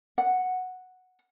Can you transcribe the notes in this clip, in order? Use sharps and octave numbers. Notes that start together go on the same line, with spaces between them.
F#5